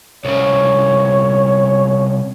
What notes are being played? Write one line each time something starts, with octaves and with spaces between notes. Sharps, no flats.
C2 C#3 C#5